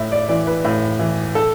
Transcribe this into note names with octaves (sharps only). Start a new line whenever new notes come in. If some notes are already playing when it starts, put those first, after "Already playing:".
Already playing: A2 E5
D5
E3 D5
B4
A2
E3
A4